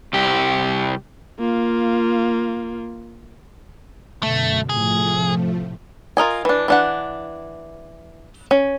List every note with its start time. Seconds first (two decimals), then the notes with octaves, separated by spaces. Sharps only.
0.13 C2 G4
1.40 A#3 F4
4.23 F#2 B2 D3 A3
4.69 A2 C3 F3 A3 G#4
6.17 F4 A#4 D#5 G#5
6.45 E3 D4
6.68 E3 D4 F#5
8.51 C#4